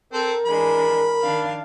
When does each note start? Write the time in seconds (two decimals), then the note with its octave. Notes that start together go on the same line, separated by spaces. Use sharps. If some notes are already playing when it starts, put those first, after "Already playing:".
0.13 C4 A4 A#4 C5
0.46 E3 G#3 D4 B5
1.20 D#3 D4 F5